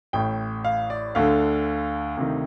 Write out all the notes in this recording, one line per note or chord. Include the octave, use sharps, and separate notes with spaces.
A1 A2 G5
F5
D5
D2 D3 F5
D2 C3 D#3